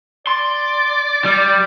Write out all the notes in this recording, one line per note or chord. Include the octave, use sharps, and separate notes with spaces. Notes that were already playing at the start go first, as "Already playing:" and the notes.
D5 C6
G3